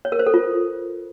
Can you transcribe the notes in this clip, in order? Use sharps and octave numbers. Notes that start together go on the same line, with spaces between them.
C#5
A#4
C5
A4
F4